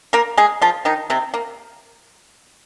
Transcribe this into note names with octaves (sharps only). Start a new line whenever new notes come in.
A#3 A#4
G#3 G#4
F3 F4
D#3 D#4
C3 C4
A#3